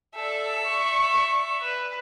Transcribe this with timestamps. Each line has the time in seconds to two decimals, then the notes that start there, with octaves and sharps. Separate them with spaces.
0.15 A4 D5 E5
0.65 C#6
1.62 B4